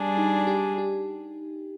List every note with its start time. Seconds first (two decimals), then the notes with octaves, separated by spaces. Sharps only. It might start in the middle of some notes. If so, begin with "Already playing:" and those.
Already playing: G3 D4 G#4
0.18 D#4
0.47 G4
0.78 G4